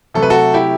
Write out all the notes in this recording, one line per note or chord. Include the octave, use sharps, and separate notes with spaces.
C3 F#3 A3 A4
B4
F#4 A4
E4 G4